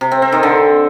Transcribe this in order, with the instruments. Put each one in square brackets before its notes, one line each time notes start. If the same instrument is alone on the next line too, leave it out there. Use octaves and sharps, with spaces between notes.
[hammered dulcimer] C3
C4
C4
D#3
D3